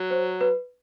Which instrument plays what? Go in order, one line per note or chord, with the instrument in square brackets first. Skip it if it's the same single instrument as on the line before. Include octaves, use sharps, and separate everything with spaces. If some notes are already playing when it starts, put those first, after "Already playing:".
Already playing: [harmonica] F#3
[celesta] C5
B4